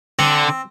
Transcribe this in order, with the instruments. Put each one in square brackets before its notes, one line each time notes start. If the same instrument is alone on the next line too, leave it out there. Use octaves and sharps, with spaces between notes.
[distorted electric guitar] D3 [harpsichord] C4